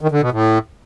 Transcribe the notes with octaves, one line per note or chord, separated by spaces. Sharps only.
D#3
D3
B2
A2